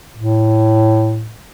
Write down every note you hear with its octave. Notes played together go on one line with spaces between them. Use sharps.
A2